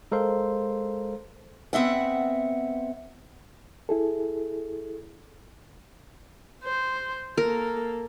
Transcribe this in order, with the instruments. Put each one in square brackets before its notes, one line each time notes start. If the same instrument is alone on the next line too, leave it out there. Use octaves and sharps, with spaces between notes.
[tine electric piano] G#3 A4 A#4 C5 F5 C6
[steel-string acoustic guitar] B3 C4 E5 F#5
[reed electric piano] E4 G#4 A4
[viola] C5
[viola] A#3 A4 [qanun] A#4